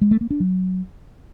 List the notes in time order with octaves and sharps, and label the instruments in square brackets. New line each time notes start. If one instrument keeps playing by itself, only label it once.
[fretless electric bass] G#3
A3
A#3
D4
F#3